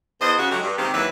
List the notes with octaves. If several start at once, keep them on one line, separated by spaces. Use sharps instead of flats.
E2 C5 D#5
C#3 F#4
F#3 G#3 A3 D#4 F#4 G4
G2
C3 D#3 G#3 A#3 C4 G4
D#2 E3 F#3 B4 E5